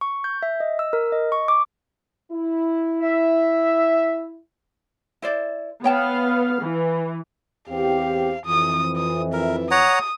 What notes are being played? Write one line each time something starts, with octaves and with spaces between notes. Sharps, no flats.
C#6
G6
E5
D#5
E6
A#4
D#5
C#6
D6
E4
E5
E4 C5 D5
B3 C#5 F5 G5 A5
E3
E2 C4 G4 F5
F2 E3 D#6
D#6
A#4 E5
C#5 F#5 A#5 D#6